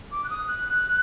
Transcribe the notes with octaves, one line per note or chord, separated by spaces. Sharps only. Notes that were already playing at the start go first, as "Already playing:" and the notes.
D6
F#6
D#6
F#6